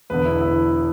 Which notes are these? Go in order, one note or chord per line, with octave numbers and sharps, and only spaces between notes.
E1 E2 D3 B4
E4
E4